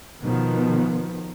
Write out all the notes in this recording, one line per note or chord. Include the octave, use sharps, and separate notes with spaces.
B2 D#3 F3 B3